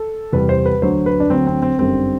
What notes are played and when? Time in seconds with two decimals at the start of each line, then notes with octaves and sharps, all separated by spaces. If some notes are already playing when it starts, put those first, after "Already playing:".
Already playing: A4
0.32 E2 C3 G3 B4
0.49 C5
0.66 B4
0.82 D2 D3 F#3 C5
1.06 B4
1.20 D4
1.30 D2 D3 F#3 C4
1.47 C4
1.62 C4
1.79 G1 F#2 D3 G3 C4